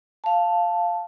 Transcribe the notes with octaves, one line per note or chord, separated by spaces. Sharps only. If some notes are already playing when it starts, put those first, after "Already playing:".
F5 A5